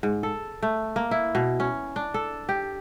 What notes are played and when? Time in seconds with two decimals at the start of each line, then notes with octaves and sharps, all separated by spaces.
0.03 G#2
0.23 A4
0.63 A3
0.96 A#3
1.11 E4
1.35 B2
1.60 C#4
1.96 D4
2.14 A4
2.49 G4